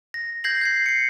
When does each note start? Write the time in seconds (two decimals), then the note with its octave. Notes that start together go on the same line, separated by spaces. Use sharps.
0.14 A#6
0.44 G6 G#6 A#6 C7 F#7
0.61 G6 G#6 C7
0.86 C7 C#7